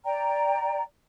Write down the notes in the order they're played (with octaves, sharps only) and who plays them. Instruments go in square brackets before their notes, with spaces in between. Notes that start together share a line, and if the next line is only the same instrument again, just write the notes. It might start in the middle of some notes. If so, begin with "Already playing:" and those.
[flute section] D5 G5 A#5